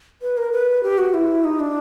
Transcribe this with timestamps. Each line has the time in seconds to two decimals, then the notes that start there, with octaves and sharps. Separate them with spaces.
0.22 B4
0.37 A#4
0.52 B4
0.83 G4
0.98 F#4
1.14 E4
1.44 D#4
1.60 D4